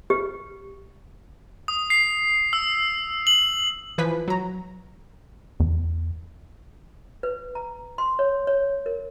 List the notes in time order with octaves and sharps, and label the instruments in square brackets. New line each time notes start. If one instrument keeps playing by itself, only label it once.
[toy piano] G4
[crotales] D#6
C7
E6
F#7
[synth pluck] E3 F3 B4 G#5 B6
F#3 A#5
[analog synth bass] E2
[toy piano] B4
A#5
C6
C#5
C#5
A#4